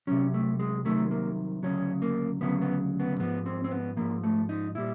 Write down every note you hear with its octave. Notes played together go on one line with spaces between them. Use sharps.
C2 C3 D#3 F#3 C#4
A3
G#3
C2 C3 D#3 F#3 A3
A#3
D2 C#3 F#3 C#4
A#3
D2 C#3 F#3 B3
B3
B3
G#2 F3 B3
C4
C4
B3
G#2 F3 A#3
A3
D#4
A#2 G3 E4